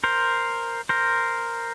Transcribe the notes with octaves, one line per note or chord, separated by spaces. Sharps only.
A#4 C5
A#4 C5